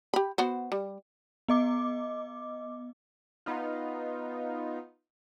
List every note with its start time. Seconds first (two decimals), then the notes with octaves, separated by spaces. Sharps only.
0.14 G4 B5
0.38 B3 F#4 C5
0.72 G3
1.48 B3 D#5 D6
3.46 B3 D#4 F4